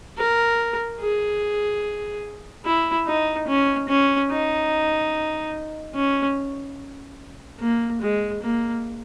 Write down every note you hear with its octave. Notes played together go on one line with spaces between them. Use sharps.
A#4
G#4
E4
D#4
C#4
C#4
D#4
C#4
A#3
G#3
A#3